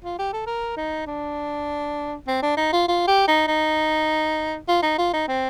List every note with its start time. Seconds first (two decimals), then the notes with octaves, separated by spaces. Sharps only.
0.04 F4
0.19 G4
0.33 A4
0.47 A#4
0.77 D#4
1.07 D4
2.27 C4
2.42 D4
2.57 D#4
2.73 F4
2.88 F4
3.07 G4
3.28 D#4
3.48 D#4
4.68 F4
4.83 D#4
4.98 F4
5.13 D#4
5.28 C4